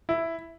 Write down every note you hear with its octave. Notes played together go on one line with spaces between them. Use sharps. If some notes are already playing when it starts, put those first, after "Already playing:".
E4